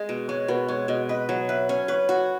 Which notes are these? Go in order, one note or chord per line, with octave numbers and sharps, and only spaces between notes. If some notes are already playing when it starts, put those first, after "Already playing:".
Already playing: G#3 D#5
B2
G#3 C#5
B2 B4
G#3 C#5
B2 D#5
B4 D#5
F#3
B4 E5
C#4
B4 C#5
F#4